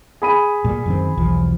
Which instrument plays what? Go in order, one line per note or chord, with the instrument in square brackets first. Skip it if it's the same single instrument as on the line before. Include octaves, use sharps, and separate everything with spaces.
[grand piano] G#4 B5 D#7
[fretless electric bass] A#2 G3
F#2 D#3 C4
B1 E2 F3